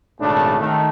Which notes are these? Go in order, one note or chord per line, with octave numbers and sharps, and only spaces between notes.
G#1 A#2 C#3 A3 D4
D#3 A3